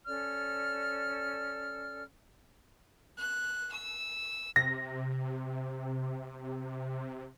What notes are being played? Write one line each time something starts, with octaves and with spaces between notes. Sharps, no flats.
C#4 A4 D5 F6
F#6
E6
C3 A#6